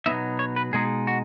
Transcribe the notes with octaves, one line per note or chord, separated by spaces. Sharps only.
B2 F#3 B3 D#4 E5
C#5
B4
B2 G#3 D#4 G#4
F#4